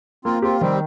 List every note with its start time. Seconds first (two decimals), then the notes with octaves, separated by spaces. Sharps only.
0.25 A#3 C4 F4
0.42 C4 F4 G4
0.61 D#3 G3 C4